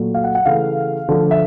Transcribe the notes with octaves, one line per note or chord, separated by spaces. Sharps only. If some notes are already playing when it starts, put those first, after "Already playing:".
Already playing: A#2 F#3 A3
F5
F#5
F#5
C#3 E3 A3 F5
D3 F3 A3
E5